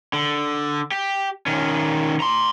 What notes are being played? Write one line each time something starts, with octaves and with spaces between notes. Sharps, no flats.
D3
G4
D#3 C#4
A#5 C6